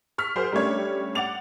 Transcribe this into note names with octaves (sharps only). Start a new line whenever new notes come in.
C#6 F6 B6
F#3 G#4 A#4 C5
G3 A3 C#4 D4 C#5
F#5 D6 A6 F7